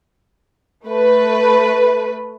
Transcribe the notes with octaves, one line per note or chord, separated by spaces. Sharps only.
A3 B4